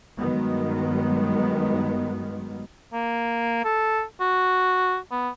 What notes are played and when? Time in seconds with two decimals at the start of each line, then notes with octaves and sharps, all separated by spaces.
0.18 G2 D#3 F#3 G#3 B3
2.93 A#3
3.64 A4
4.21 F#4
5.11 B3